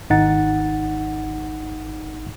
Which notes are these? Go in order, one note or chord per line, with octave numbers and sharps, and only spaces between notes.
G#1 D#4 F#5 A6